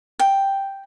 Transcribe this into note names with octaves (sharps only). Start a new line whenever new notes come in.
G5